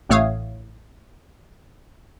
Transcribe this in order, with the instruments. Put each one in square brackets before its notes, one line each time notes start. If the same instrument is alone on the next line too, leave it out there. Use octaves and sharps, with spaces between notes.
[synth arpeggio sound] A1 A2 A3 C#5 F5 D#6